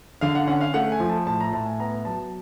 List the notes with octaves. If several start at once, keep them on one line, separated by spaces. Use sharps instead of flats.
D3 F5
F#5
C#4 F#5
F5
A3 F#5
G#5
F3
A5
A2 A5
A#5
A2 A5
G#5
B3 A#5
F#3 A5